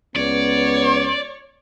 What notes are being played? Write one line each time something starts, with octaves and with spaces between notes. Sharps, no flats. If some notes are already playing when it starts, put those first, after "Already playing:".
C#2 B3 C#5 D5